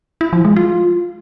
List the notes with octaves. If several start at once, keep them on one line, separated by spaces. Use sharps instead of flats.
E4
F3
G#3
F4